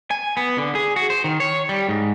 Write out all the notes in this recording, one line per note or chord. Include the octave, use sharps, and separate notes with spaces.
G#5
B3
D3
G#4
F#4
C5
D#3
C#5
G3
G#2